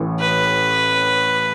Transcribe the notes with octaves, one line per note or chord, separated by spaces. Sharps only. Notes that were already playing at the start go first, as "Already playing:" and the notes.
Already playing: A1 A2 E3
B4